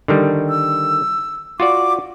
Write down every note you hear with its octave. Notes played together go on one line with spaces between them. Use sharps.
D3 D#3 G3
E6
F4 F#4 D5 D6